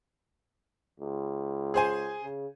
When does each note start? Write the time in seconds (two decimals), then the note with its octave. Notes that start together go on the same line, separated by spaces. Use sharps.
1.00 C#2
1.74 G#4 C5 G#5
2.23 C#3